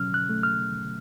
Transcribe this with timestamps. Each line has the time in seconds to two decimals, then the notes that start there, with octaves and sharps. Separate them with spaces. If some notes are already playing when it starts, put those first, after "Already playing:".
Already playing: B2 F#3 C#4 F6
0.14 F#6
0.29 A3
0.43 F6